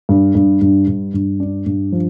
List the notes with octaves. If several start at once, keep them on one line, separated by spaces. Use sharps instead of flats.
G2
G2
G2
G2
G2
D4
G2
F3